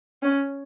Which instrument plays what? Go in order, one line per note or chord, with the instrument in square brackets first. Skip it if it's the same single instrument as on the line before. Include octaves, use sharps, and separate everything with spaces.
[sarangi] C#4